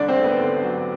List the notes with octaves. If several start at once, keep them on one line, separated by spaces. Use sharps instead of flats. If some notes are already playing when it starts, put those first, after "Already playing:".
Already playing: C2 D3 D4 D5
C4 C5
A3
B3 B4
D3
F#3